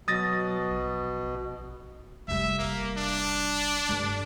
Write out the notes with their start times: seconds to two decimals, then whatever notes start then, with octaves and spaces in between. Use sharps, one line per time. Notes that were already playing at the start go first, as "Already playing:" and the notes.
0.08 B2 F#3 D#6 A6 A#6
0.71 A#1
2.28 F1 G3 E5
2.58 A#3
2.97 D4
3.89 G2 D3